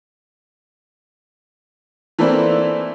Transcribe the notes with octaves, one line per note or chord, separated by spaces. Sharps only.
E3 A3 A#3 C4 D4 E4